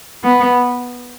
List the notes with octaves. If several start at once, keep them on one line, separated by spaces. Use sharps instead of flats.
B3